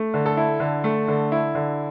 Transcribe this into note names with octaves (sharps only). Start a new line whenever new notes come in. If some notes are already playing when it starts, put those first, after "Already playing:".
Already playing: A3
D3
A4
E4
D3
A3
D3
E4
D3